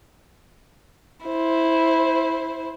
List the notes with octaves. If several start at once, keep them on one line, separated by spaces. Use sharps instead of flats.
E4 C5